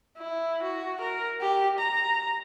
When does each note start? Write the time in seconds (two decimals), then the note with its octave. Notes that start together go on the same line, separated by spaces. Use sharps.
0.17 E4
0.63 F#4
1.01 A#4
1.41 G4
1.79 A#5